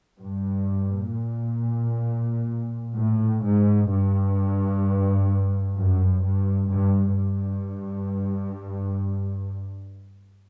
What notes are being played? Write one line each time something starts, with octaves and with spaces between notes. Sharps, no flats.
G2
A#2
A2
G#2
G2
F#2
G2
G2
G2